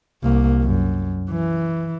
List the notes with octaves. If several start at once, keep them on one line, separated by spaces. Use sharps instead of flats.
C2 A#3
F#2
E3